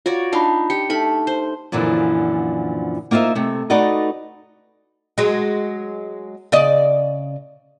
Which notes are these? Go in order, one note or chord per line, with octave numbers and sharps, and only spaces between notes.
F4 F#4 C#5 D5
D4 D#4 F4 F5 B5
G4 C#7
A3 D#4 B5
C5
F#2 A#2 D3 E3 F3
A#3 D#4 F4 C5 E5
C3 A3
A3 D#4 F#4 B4 D5 D#5
F#3 G#3
C#3 D5 D#5